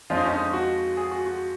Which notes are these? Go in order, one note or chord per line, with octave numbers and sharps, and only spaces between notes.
F2 F3 G#3 F4
D#4
C#4
D#4
F#4
G#4
F#4
F#4